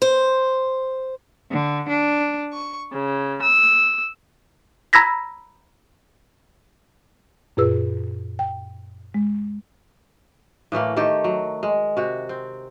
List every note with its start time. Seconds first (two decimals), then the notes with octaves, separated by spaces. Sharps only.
0.02 C5
1.51 D3
1.89 D4
2.53 C#6
2.92 C#3
3.40 E6
4.93 A#5 B5 E6 G#6 A#6 B6
7.57 F#2 A#2 F4 G#4 B4 E6
8.39 G5
9.14 G#3
10.72 A2 E3 A3 A#3
10.97 D#3 A3 G4 A4
11.24 F#3
11.63 G#3
11.97 C3 F#4
12.29 C4